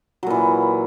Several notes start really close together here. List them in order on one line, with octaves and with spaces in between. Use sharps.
F#3 A#2 E3